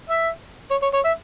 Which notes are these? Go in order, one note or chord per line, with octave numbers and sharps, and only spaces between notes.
E5
C#5
C#5
C#5
E5